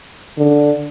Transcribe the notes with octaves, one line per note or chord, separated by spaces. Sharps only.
D3